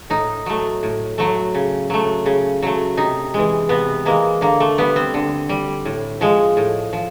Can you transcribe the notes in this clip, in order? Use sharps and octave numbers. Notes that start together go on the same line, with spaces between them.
A2 D#4
F#3 A3
A2
F#3 A3
C#3
F#3 A3
C#3
F#3 A3
C3 D#4
E3 G#3
C3 B3
E3 G#3 A#3
D3 A#3
A3
G3 B3
C4
D3
G3
A2
F3 G#3
A2
F3